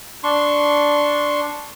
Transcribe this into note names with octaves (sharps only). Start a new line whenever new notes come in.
D4 C6 C#6